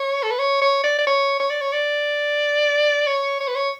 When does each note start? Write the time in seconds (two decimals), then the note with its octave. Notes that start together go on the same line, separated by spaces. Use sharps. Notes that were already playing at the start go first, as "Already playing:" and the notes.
Already playing: C#5
0.23 A4
0.31 B4
0.39 C#5
0.61 C#5
0.84 D5
0.98 D5
1.07 C#5
1.40 C#5
1.50 D5
1.61 C#5
1.73 D5
3.07 C#5
3.40 C#5
3.48 B4
3.56 C#5